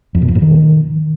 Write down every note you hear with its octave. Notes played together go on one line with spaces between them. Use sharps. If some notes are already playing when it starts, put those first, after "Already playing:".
F2
B2
F2
A#2
D#3